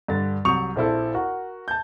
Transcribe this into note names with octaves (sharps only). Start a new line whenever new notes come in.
G2 D3 A6
C2 F#3 C#6 D#6 G6 F7
A#1 C4 E4 A4
F#4 A#4
A5 G6